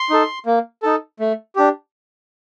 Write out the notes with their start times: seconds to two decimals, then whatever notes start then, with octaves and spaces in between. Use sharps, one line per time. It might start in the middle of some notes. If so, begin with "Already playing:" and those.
Already playing: C6
0.10 D#4 A4
0.46 A#3
0.83 D#4 A4
1.20 A3
1.56 D4 G4